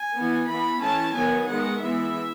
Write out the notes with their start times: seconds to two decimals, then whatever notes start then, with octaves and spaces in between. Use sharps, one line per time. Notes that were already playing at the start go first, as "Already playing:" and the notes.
Already playing: G#5
0.14 E3 B3
0.47 E3 B3 B5
0.80 E3 A3 C#4 A5
1.14 D#3 F#3 B3 G#5
1.48 D#3 G#3 B3 F#5
1.81 E3 G#3 B3 E5